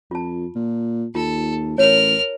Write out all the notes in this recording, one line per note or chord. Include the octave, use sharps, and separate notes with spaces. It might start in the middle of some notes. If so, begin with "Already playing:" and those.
F2 F4 A5
A#2
D#2 F4 A4
A1 A#4 C#5 F6